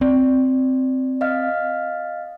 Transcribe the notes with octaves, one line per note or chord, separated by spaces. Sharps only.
C4 D5
D#5 F5 F6